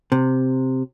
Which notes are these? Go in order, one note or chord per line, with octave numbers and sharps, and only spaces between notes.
C3